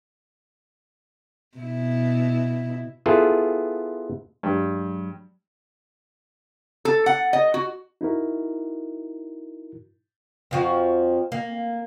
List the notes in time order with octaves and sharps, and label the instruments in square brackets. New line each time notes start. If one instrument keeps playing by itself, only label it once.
[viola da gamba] B2 E4
[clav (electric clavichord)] B3 E4 F4 G#4 A4
[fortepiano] G2 [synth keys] F#3 G#3
[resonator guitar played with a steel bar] A4
F#5
D#5
F#4
[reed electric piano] D#4 E4 F#4 A#4
[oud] F2 F3 F#4
A#3